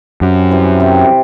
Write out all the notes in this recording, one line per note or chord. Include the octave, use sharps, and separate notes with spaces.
F#2 C3
E3 G3 C4
C3